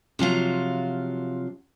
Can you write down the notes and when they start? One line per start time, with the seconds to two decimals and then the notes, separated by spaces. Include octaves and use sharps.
0.19 C3 F3 F#3 F4